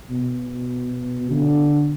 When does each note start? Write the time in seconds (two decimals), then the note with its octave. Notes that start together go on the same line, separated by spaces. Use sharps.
0.10 B2
1.31 D3